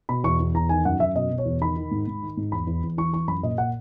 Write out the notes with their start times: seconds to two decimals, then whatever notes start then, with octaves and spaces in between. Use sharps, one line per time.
0.09 B2 B5
0.24 E2 C#6
0.40 E2
0.54 E2 A#5
0.69 D#3 G#5
0.85 F#2 F#5
1.00 F#2 E5
1.15 B2 D#5
1.30 B2
1.38 C#5
1.45 E2
1.61 D#3 B5
1.77 D#3
1.91 G#2
2.07 G#2
2.22 D#3
2.37 G#2
2.52 E2 B5
2.67 E2
2.83 E2
2.98 E3 C#6
3.13 E3 C#6
3.28 F#2 B5
3.43 A#2 D#5
3.58 A#2 F#5